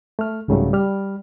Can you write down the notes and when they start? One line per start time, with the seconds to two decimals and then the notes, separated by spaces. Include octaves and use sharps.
0.19 A3 F6
0.48 C2 G#2 C#3 F#3 G3 A3
0.73 G3 F6